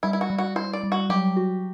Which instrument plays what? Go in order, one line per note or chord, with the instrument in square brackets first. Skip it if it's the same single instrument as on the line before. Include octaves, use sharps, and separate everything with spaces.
[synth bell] G3 [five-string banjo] E4
[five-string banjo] E4
F#4
[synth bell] G3
[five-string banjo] F#4
[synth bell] E4 [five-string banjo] C5
[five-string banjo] D5
[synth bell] G3
[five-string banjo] F#4
[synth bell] F#3 [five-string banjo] G4
[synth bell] F#4